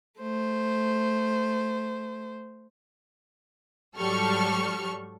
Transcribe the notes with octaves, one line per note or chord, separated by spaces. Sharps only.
A3 C5
G#2 F#3 G3 A4 C#6 F6